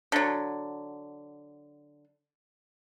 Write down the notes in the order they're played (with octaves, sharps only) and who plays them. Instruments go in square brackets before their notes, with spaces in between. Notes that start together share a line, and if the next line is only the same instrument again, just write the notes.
[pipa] D3 F#3